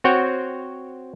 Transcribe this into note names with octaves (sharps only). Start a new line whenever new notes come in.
C4 F#4 C5 C#5 F#5 G5